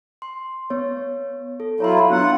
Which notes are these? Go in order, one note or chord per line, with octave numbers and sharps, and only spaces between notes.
C6
B3 C#5
A4
F#3 E4 F4 C#5 A#5 C6
B3 D4 F4 F#5